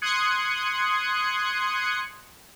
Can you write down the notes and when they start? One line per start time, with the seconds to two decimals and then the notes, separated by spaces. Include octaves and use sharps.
0.02 C6 D#6 F#6 G#6 C#7